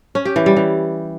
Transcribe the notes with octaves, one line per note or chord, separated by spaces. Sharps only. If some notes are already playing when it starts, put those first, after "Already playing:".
C#4
G4
E3
G3
E3